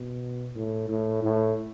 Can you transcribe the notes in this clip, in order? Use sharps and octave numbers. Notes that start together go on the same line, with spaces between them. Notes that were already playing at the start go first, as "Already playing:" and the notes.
Already playing: B2
A2
A2
A2